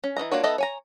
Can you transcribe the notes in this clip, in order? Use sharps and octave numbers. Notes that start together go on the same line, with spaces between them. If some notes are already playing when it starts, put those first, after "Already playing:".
C#4
E3 F3 D#5 A#5
A#3 D4 F4 F#4 C#5
B3 D#4 A4 D#5 E5
C#5 G#5 A#5